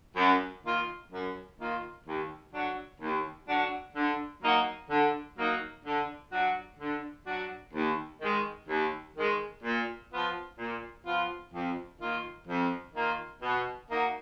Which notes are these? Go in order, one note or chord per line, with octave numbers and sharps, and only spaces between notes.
F#2
D#3 A#3 F4
F#2
D#3 A#3 F4
D#2
D3 F#3 D4 F#4
D#2
D3 F#3 D4 F#4
D3
F#3 A#3 D#4 F#4
D3
F#3 A#3 D#4 F#4
D3
F#3 D4 F#4
D3
F#3 D4 F#4
D#2
D#3 G#3
D#2
D#3 G#3
A#2
F3 B3 F4
A#2
F3 B3 F4
F2
D#3 A#3 F4
F2
D#3 A#3 F4
B2
A#3 D#4 F#4